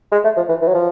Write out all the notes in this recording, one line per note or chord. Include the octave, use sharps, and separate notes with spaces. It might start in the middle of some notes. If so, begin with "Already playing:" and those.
G#3
A3
F3
E3
E3
F#3
F3